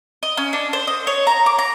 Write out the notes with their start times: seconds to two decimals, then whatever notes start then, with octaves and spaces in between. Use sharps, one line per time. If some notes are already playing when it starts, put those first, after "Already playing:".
0.23 D#5
0.37 C#4
0.53 D4
0.73 C5
0.87 D#5
1.07 C#5
1.27 A#5
1.46 D6
1.59 A#5